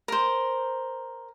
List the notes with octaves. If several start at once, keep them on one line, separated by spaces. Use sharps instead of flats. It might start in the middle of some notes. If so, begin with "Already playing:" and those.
A#4 C5